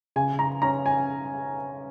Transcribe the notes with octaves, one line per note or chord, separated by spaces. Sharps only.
C#3 G#5
A#5
C#4 A#5
G#5